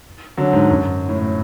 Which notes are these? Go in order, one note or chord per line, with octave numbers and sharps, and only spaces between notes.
D3 F#3
G#2
F#2
A2